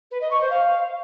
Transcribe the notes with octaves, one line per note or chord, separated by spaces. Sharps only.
B4
D#5
C#6
C5
F5